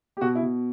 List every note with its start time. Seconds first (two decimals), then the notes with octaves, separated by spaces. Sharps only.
0.17 G4
0.21 B2 F#4
0.35 E4
0.42 B2